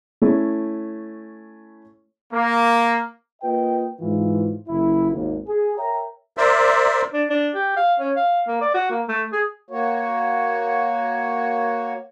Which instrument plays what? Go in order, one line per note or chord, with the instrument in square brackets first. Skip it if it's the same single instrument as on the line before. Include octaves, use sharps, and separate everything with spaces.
[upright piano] A3 C#4 E4
[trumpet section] A#3
[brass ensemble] A#3 F4 B4 D#5 G5
G#2 E3 F4
F#1 E4
G#1 D#2
G#4
A#4 C#5 E5 G5 A#5
[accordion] A#4 C5 D5 E5
[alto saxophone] D4
D4
G4
F5
C#4
F5
A#3
D5
F#4
A#3
A3
G#4
[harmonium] A#3 F#4 C#5